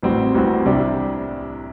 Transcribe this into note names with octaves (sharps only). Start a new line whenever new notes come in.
A1 A2 G3 C4 F#4
A1 A2 G3 C4 F#4
C2 C3 G3 D4 G4